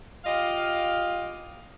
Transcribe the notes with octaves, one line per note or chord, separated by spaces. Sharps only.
F4 G4 D#5 F5